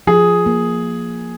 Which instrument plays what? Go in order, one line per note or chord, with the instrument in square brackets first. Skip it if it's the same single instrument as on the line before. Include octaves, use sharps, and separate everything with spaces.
[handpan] F3 [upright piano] G#4
[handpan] A#3